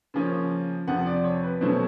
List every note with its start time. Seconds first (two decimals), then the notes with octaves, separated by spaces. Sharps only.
0.14 C#3 F3 A#3 C#4
0.88 F2 C3 F3 F#5
1.06 D5
1.24 C#5
1.43 B4
1.61 B2 F#3 A3 C#4 C5